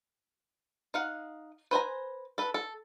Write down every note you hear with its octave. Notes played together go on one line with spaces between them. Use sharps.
D#4 F5 F#5
B4 C5 G#5 A#5
A4 B4
A4